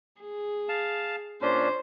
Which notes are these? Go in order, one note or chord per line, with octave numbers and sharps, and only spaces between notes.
G#4
F5 A5
A#2 C#4 D4 C5